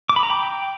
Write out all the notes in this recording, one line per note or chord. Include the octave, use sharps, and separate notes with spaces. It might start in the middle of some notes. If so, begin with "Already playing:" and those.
D6
B5
A#5
G5